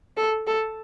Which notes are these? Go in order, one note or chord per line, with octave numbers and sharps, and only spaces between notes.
A4
A4